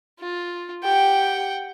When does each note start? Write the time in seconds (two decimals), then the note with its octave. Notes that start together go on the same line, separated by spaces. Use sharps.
0.19 F4
0.84 G4 F#5 G5